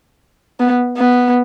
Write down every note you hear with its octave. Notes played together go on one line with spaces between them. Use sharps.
B3
B3